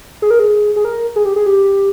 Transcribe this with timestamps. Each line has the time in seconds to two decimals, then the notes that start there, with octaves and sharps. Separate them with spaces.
0.22 G#4
0.31 A#4
0.39 G#4
0.76 G#4
0.85 A#4
1.16 G#4
1.25 G4
1.36 G#4
1.46 G4